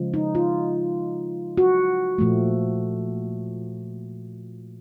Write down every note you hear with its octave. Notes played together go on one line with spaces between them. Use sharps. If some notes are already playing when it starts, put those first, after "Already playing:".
Already playing: C#3 F3 G#3
D#4
F4
F#4
A#2 F3 A3